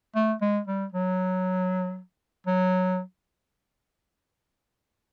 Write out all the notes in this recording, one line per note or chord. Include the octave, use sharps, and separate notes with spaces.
A3
G#3
G3
F#3
F#3